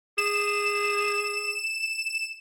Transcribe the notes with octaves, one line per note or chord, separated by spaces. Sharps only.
G#4 E7